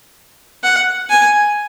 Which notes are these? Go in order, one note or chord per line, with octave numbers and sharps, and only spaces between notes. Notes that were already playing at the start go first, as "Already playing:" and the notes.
F#5
G#5